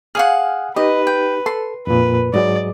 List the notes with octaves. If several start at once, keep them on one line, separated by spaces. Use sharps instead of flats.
G#4 F5 F#5 G#5 F6
D#4 G4 B4 D#5
G5
A4 C6
F2 A#2 B4
G#2 F#3 G#4 D5 D#5